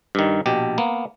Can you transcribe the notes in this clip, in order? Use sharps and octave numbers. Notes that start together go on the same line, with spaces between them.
G2 D#3
A#1 B2 G4
A#3 B3